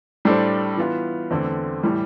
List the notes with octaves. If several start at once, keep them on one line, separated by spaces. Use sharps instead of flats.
A2 G3 D4 A4 C5
E3 B3 F4
E2 D3 A3 C4
A2 E3 G3